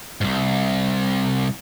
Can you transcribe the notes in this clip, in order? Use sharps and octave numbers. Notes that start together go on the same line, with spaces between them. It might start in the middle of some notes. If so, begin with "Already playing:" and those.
C2 G#2